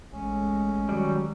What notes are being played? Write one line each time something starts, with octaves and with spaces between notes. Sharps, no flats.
A1 G#3 A3 C#4
D#3 F#3 G3